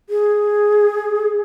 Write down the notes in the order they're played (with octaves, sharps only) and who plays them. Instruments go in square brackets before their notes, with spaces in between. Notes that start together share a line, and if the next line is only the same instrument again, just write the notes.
[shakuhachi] G#4